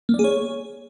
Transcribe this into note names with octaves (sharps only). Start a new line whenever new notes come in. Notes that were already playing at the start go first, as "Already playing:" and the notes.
A#3
D5
G#4
C#5